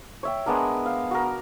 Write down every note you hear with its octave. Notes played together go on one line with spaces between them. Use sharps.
C#5 E5 G5
G#3 B3 D4 A#4
F5
F#4 A#4